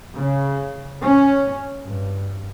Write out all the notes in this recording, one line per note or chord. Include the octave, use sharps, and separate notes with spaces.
C#3
C#4
G2